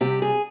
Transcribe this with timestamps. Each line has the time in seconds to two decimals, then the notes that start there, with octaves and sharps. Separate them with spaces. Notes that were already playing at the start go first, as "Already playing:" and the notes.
0.01 C3 G3 G4
0.22 G#4